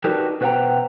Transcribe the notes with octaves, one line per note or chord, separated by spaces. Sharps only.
D4 D#4 F#4 G4 A#4 B4
B2 B4 C5 F#5 G5 A#5